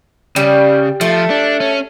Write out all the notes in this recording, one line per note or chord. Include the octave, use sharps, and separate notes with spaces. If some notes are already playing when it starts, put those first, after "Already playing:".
C#3 G3
F3 A3
D4
C#4